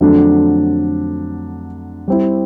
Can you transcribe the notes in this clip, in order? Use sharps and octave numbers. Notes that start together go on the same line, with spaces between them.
F2 D3 F#3 A3 D4
G3 C4 E4